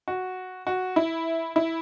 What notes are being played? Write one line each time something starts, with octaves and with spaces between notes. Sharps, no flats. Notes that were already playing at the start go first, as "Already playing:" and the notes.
F#4
F#4
E4
E4